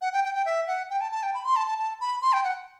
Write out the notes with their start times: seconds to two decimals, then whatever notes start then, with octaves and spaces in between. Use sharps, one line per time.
0.01 F#5
0.13 G5
0.24 G5
0.35 G5
0.46 E5
0.67 F#5
0.90 G5
1.01 A5
1.12 A5
1.23 G5
1.34 B5
1.45 C6
1.56 A5
1.67 A5
1.78 A5
2.01 B5
2.22 C6
2.33 G5
2.44 F#5